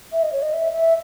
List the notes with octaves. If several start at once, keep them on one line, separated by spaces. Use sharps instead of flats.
E5
D#5
C#5
D#5
E5
E5